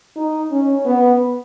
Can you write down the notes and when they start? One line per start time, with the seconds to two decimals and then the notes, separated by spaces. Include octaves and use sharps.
0.16 D#4
0.52 C#4
0.86 B3